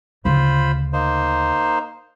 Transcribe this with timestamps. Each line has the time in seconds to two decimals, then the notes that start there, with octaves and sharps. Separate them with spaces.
0.25 D2 C#3 F4 C5 B5
0.93 A#3 D#4 C5